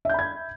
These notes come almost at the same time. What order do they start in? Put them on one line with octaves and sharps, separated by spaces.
E5 G6 B5 G#6